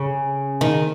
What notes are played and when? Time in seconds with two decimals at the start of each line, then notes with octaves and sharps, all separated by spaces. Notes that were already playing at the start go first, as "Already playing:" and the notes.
Already playing: C#3
0.61 D#3